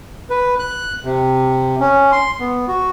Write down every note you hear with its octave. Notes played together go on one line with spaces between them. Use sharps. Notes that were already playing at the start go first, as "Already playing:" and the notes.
B4
F#6
C3
C#4
C6
B3
F#4